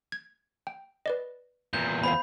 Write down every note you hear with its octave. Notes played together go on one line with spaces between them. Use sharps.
G#6
G5
B4 D5 D#5
E2 A#2 G6
B3 C5 F5 B5